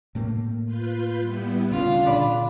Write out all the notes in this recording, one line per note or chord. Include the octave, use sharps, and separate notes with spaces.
A2 A3 A#3
F4 B4 G6
G3 B3 E4
D2 C#3 C#4 D4 F4
A#2 D3 B4 D5 B5